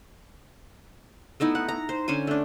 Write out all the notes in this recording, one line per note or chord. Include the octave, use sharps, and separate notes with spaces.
A3 B3 D#4 E4
F#5
A#5
C5
D3 C#4 C5 G#5
A3 D4